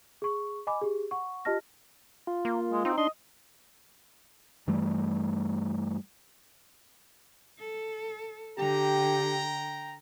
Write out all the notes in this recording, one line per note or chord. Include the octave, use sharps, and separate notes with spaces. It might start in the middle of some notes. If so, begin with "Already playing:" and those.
G#4 C#6
D#5 G#5 B5 D6
G4 G#4
F#5 C#6
F4 G4 D#5 A5 F6 A#6
F4
A#3
G#3
C4 D#4
D4 D#5 C6
G2 E3 G3 A3
A4
D3 G4 G5 A#5